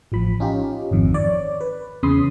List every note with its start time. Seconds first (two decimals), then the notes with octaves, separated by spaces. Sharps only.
0.12 A1 F3 B5
0.40 C#4 D#4 F4 G4
0.91 G#1 F2 D#3
1.14 C#5 D5
1.61 B4
2.03 E2 C#3 C#4 B5 C6 D#6